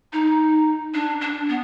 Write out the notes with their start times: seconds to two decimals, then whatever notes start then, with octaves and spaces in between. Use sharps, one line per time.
0.13 D#4
0.94 D4
1.21 D4
1.49 B3